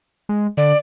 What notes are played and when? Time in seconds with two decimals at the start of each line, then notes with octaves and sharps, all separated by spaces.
0.29 G#3
0.57 D3 D5